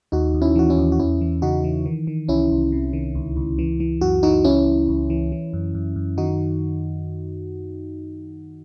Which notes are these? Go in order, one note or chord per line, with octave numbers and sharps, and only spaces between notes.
D#2 D#4 F#4
D#2
C#4 E4
E3 F#4
C#4 E4
D#2
F#4
E2 C#4 E4
E3
C#3 D#4 F#4
E3
D#3
D#3
C2 C#4 E4
C2
C3
D#3
C#2
C#2
E3
E3
F#2 F#4
E3 D#4 F#4
C#2 C#4 E4
C#2
C#2
E3
E3
F#2
F#2
F#2
D#3 D#4 F#4